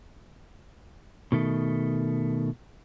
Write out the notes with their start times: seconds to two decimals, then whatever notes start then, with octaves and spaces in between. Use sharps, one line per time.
1.32 B2 D#3 A3